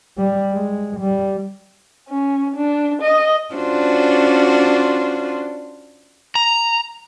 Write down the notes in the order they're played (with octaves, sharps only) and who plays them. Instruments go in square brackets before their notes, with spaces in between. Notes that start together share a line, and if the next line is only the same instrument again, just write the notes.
[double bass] G3
G#3
G3
[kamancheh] C#4
D4
D#5
[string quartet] C#4 D4 F4 F#4 C5
[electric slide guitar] A#5